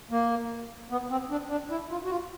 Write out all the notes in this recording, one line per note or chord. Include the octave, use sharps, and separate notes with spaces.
A#3
B3
C4
D4
D4
E4
F4
F#4
F4